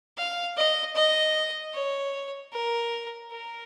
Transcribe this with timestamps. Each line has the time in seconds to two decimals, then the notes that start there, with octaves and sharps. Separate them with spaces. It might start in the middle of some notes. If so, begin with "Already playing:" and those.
0.17 F5
0.57 D#5
0.95 D#5
1.74 C#5
2.53 A#4
3.31 A#4